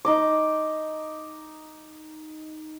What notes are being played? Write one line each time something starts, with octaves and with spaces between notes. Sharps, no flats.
D#4 D#5 D6